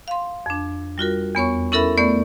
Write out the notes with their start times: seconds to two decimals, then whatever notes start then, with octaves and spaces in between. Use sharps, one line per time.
0.08 F5 C6
0.46 F2 D4
0.98 G3 F4 F#4 A#4
1.35 E2 B3 C#5 C#6
1.72 C#4 E4 A4 A#4 E5 B5
1.97 A3 B3 D5 C#6 G6